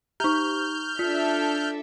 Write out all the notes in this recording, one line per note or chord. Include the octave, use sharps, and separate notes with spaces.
D#4 G4 A#5 C#6 F6 G6
D4 F4 A4 E5 B6